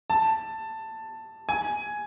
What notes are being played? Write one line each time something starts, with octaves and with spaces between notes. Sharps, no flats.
A5
G#5